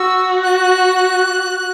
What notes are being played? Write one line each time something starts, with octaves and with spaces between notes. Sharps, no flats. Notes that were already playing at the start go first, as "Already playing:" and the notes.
Already playing: F#4 E6
F#6